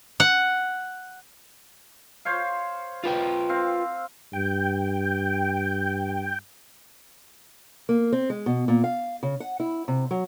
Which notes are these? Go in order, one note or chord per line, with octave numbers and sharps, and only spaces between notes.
F#5
C5 C#5 F5
F4 B4 G5
C4 F5
G2 G5
A#3
C4
G#3
B2
A#2
F5
C#3
F#5
E4
C3
F#3